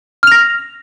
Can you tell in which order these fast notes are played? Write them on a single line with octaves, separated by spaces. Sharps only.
F6 F7 A#6